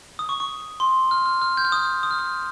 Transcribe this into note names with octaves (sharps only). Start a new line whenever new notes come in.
D#6
C#6
C#6
C6
F6
F6
F6
G6
F6
D#6
D#6
F6
D#6